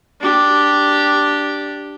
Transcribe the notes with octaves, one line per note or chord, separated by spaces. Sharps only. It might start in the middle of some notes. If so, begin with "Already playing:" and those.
D4 G4